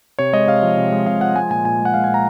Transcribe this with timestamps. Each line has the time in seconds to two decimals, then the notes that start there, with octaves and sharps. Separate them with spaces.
0.19 C3 C#5
0.33 G#3 D#5
0.47 C3 F5
0.63 F3
0.77 C3
0.92 G#3
1.07 C3 F5
1.20 F3 F#5
1.36 G#3 G#5
1.51 A#2 G#5
1.65 A#2 G#5
1.80 G#3
1.85 F#5
1.94 G#3 F5
2.04 G#5
2.08 A#2
2.14 A#5